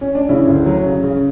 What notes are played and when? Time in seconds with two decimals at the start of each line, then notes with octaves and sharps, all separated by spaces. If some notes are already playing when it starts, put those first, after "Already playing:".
0.01 C#4
0.15 D4
0.29 C#3 C#4 E4
0.47 D2
0.66 F#3
0.85 C#3
1.03 C#3